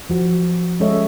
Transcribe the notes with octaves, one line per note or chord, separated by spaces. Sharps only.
F3 F#4
G#3 C#4 A4 C#5 D#5 E5